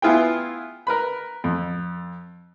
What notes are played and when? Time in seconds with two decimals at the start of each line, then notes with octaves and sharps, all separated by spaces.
0.02 B3 E4 F4 G#4 G5
0.87 A#4 B4 B5
1.44 F2